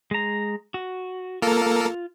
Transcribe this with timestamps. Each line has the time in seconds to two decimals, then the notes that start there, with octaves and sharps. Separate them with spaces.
0.11 G#3 A#5
0.74 F#4
1.42 A#3 F4 A4 A#4